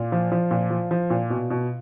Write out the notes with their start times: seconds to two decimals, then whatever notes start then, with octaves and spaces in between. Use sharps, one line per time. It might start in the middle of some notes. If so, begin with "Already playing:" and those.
Already playing: A#2 F4
0.12 F3
0.32 F3
0.51 A#2
0.70 F3
0.91 F3
1.10 A#2
1.30 B2
1.50 B2